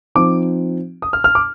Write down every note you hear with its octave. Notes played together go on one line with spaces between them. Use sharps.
F3 C4 D#4 D6
D#6
F6
F6
D6